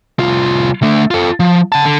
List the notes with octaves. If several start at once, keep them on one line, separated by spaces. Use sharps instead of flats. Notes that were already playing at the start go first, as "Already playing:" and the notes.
C2 F4
A3 D4
F4 A4
F3
F#5 A5
D3